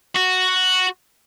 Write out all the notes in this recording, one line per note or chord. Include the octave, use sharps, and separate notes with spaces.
F#4